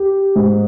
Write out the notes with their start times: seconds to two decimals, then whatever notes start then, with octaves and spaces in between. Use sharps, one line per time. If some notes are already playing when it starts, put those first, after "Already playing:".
Already playing: G4
0.36 G#2